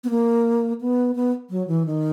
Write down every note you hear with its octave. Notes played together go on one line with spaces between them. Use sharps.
B3
A#3
B3
B3
F#3
E3
D#3